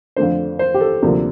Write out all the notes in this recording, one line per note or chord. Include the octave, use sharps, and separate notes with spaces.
F2 D3 A3 D4 C5
C5
G4
A4
D2 C3 F3 A#3